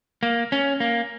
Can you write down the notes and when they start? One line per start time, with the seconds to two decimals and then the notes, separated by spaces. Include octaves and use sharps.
0.23 A#3
0.52 C#4
0.80 A#3